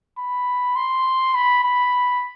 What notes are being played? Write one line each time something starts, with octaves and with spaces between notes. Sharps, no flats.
B5
C6
B5
B5